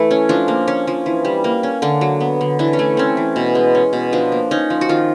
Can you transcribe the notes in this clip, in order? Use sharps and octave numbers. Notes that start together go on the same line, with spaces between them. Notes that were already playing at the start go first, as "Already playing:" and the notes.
Already playing: E3 A3
C#4
F3 D4
A#3
C#4
F3
E3
G3
A#3
C#4
D3 D4
F#3
B3
D3
E3 D4
C#4
A3
C4 C#4
E3
B2
G#3
C#4
B2
F3 D4
A#3
C#4 D#4
F3
F#4
D#3 F4